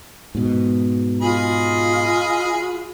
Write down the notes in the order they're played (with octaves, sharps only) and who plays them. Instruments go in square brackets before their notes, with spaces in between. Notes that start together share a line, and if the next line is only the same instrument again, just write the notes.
[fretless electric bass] G#2 B2
[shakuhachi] F4 [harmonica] G#4 D#5 B5